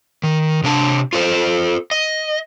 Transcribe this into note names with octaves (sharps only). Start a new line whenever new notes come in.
D#3
C3 D4 A5
F4 A4 C5
D#5